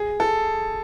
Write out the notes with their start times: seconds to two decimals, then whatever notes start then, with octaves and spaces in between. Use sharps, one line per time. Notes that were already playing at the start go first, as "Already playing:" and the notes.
Already playing: G#4
0.20 A4